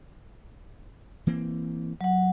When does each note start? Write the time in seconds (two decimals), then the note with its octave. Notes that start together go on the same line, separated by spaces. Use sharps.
1.27 E3 A#3 C4
2.01 F#3 F#5